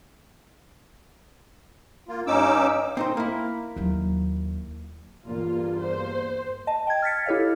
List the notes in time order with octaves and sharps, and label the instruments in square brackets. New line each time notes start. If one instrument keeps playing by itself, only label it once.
[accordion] A#3 F4
G2 C#4 D#4 D6 E6
[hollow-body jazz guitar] C4 D#4 C5
A#3 E4
[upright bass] D#2 F#3
[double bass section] E2 G2 A#3 [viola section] F4
[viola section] C5
[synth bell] D#5 A5
G5 G#6
F6 A6 B6 C#7
E4 G4 A4 C#5 D#5 F5